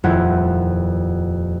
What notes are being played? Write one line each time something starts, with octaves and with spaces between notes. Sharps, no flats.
D#1 F2 E4 F#5 G6 G#6